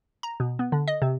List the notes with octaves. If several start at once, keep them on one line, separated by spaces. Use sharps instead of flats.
A#5
B2
B3
D3
D#5
C3